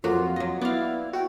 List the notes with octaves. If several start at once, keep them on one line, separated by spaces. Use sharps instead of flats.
F2 F#3 A#3 F4 F#4
F#3 D#5
B3 E4 D5 F5
F#4 G5